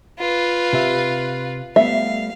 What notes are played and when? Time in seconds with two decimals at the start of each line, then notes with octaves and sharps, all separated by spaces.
0.19 F4 B4
0.73 C3 E5
1.76 G3 A3 B3 E5 F5